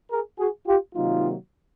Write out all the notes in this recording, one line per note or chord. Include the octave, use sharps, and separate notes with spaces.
G#4 A#4
F#4 G#4
F4 G4
C3 D#3 F#3 A#3 D#4 F4